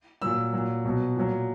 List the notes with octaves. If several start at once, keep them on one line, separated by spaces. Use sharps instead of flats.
A#2 F#3 E6
A#2 F#3
B2 F#3
A#2 F#3